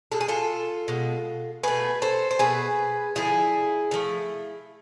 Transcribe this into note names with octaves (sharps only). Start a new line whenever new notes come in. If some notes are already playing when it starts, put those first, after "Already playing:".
B2 G#3 A4
G#4
F4 A4
B2 G#3
B2 A3 G#4 B4
A4 C5
C5
B2 A3 G#4 B4
D3 F3 A3 E4 G#4
D3 F3 A3